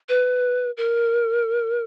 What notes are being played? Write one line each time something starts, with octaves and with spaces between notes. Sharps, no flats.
B4
A#4